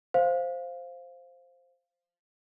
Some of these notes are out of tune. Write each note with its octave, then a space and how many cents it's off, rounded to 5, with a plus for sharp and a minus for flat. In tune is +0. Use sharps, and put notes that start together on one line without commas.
C5 +0 F5 +0